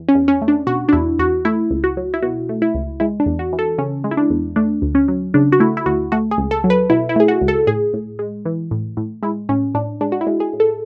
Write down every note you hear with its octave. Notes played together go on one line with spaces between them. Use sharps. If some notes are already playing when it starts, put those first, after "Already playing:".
Already playing: E2
C#4
E2
C#4
A3
D4
B2 F#4
D4
E2 E4
E2 F#4
A3 E4
C#2
F#4
F#3
E4
B2 F#4
A3
E4
C#2
G#3 E4
D4
E2
F#4
E3
A4
C#3 C#4
G#3
E4
D4
E2
A3 D4
D2
C#4
F#3
C#3 D4
F#4
A3 E4
E4
D2 F#4
A3 F#4
G#4
C#2
A4
F#3
B4
B2 E4
E4
A3 G#4
F#4
C#2
A4
A2 G#4
A2
G#3
E3
A2
A2
G#3 E4
A2 C#4
A2 D4
G#3 D4
F#4
E4
G#3
G#4
A2
A4